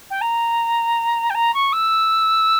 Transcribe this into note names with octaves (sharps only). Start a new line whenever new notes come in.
G5
A#5
G5
A#5
C#6
E6